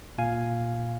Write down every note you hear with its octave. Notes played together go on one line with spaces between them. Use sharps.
A#2 F5 G#5